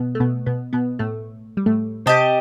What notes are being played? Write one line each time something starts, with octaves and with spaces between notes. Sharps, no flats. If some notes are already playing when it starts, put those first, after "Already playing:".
Already playing: B2 B3
A3
B2 B3
B2 B3
B2 B3
A2 A3
G3
A2 A3
C3 C4 G4 D#5 A5